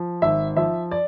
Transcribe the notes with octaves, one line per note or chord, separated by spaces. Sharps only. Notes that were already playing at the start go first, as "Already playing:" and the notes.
Already playing: F3
G#1 E5
F3 E5
D5